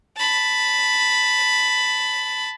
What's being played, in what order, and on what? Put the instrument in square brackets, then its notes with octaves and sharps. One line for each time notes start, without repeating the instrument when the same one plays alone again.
[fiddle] A5 B5